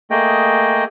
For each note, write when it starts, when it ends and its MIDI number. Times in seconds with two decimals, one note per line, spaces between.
0.10 0.84 57
0.10 0.84 58
0.10 0.84 68
0.10 0.84 75
0.10 0.84 79